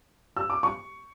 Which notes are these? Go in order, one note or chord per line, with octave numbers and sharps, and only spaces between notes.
E6
D6
C#6